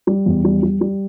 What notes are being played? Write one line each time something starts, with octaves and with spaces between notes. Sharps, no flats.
G3
E2
G3
G3
G3